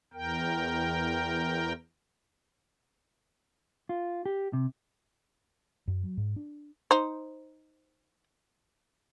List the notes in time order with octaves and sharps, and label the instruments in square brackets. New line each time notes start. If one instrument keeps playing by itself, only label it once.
[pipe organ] E2 A#4 G5
[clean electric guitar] F4
G4
C3
[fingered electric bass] F#2
F#3
G#2
D4
[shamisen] D#4 C5